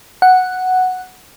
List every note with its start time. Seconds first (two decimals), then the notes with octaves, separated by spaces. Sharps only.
0.22 F#5